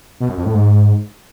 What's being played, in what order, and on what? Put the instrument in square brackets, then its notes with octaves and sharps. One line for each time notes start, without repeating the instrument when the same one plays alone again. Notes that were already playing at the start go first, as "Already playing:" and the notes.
[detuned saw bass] B2
F#2
F2
A2
G#2